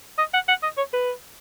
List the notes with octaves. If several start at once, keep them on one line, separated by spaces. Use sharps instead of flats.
D#5
F#5
F#5
D#5
C#5
B4